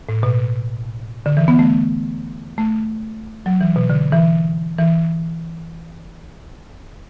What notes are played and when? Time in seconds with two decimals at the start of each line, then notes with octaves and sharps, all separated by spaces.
0.09 A2
0.23 B2
1.26 D3
1.37 E3
1.48 B3
1.59 A3
2.58 A3
3.46 F#3
3.61 E3
3.76 B2
3.90 D3
4.13 E3
4.78 E3